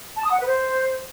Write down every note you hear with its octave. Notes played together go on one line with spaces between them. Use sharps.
A5
D#6
F#5
B4
C5